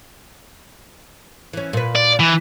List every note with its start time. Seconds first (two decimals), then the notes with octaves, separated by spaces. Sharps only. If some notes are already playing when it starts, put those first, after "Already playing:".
1.53 E3 C#4
1.73 A#2 B4
1.96 D5
2.20 E3